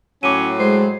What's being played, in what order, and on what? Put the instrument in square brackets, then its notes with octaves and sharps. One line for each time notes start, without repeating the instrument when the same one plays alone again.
[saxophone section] A2 F#3 [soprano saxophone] C#4 [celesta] D6 D#7
[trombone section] G#3 [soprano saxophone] C5